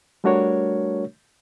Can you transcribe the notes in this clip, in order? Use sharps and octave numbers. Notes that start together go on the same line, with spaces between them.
G3 A3 D4 F#4 A#4 C#5